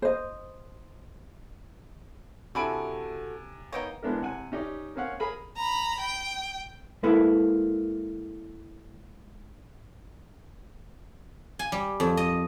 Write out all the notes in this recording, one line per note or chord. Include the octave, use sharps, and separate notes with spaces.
C5 D#5
C3 D4 E4 F#4 A4 G#5 B5 D7
A#3 B3 D#4 C#5 G5
A1 G#3 B3 D4 A#4
C3 F#5 G#5
C#4 D#4 G4 D5
A#3 C4 C#4 F5 F#5
G#4 A#4 G#5 A#5 B5
A#5 B5
G5
G#3 A#3 E4 A4 B4
G#5
G3
F2
D#5